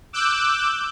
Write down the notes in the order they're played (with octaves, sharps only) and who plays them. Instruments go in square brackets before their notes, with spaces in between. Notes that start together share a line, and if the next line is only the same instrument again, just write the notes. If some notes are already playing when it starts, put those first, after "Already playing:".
[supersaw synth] D6 E6 F#6 G6